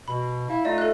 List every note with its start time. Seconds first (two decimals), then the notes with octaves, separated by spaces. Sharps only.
0.08 B2 B5
0.50 E4 F5
0.65 A3 D#4 F4 D5 D#5
0.78 A4 F#6